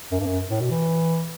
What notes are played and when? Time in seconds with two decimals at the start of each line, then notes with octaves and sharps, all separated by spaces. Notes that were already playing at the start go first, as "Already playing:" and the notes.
0.12 F#2
0.20 G2
0.26 F#2
0.50 A2
0.61 B2
0.71 E3